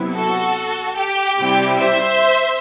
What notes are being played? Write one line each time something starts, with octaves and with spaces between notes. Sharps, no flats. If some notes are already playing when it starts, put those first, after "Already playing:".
Already playing: C3 F#3 B3 E4
F#4 A4
G4
C3 G3 C4 E4
C5 E5